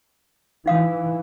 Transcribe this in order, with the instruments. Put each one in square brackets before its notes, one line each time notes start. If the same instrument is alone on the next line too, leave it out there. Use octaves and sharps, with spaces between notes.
[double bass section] E3 [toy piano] D#4 F5 D#6